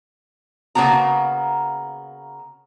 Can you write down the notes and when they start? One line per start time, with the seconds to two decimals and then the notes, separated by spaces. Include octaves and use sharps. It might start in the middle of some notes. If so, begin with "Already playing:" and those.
0.75 C#3 E3 A#3 B3 F#4 A#5